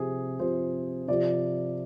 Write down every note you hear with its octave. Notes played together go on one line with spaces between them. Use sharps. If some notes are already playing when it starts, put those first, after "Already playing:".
Already playing: C3 F3 G#4
C3 F3 C5
C3 F3 D5